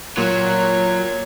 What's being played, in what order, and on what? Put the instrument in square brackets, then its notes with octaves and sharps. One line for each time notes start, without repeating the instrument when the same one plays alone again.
[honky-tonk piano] A#2 [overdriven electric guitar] F#3 [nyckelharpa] C#5